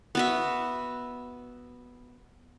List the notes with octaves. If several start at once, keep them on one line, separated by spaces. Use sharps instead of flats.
B3 F#4 E5